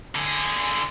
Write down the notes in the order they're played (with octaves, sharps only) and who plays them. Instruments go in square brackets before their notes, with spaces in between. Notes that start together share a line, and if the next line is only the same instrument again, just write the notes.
[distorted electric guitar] D3 G#4